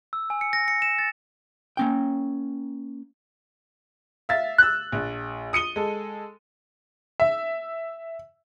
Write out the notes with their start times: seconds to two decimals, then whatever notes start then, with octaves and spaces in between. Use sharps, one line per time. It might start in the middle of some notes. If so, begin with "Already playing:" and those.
0.13 E6
0.30 G#5
0.41 C#7
0.53 A#6
0.68 C#7
0.82 E7
0.99 A6
1.77 A#3 C#4 G5
4.29 E5 F5 A6
4.58 E6 F#6
4.92 A#1
5.53 D#6 C#7 D#7 G7
5.76 G#3 A4
7.20 E5